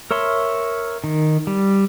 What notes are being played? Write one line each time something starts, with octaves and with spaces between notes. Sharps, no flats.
A#4 C#5 E5 C6
D#3
G3